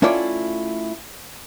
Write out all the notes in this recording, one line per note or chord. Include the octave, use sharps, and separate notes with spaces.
A3 C#4 E4 F4 D5 G5